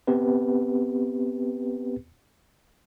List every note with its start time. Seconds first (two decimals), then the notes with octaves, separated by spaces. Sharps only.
0.07 B3 C4 G4 B4